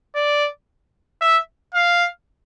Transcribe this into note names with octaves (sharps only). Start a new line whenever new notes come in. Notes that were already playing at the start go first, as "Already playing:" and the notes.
D5
E5
F5